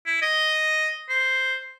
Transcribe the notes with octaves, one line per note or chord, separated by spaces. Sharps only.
E4
D#5
C5